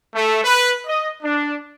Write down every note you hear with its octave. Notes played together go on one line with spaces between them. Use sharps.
A3
B4
D#5
D4